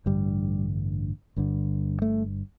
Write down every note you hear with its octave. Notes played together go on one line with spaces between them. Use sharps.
A1 G2 D3 G3
G1 G2 D3
A3